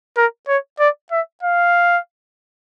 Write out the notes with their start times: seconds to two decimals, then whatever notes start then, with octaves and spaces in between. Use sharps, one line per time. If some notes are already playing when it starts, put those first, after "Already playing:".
0.16 A#4
0.48 C#5
0.79 D5
1.11 E5
1.43 F5